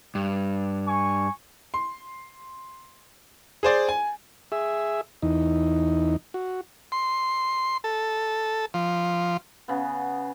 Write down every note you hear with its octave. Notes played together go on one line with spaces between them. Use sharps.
G2
G#5 C#6
C6
G#4 C5 D5
G#5
G#4 E5
E2 D#4
F#4
C6
A4
F3
C#3 B3